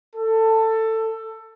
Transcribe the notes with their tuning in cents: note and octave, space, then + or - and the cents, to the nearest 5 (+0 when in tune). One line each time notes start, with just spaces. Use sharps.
A4 +15